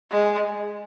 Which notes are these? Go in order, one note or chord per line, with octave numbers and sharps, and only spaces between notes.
G#3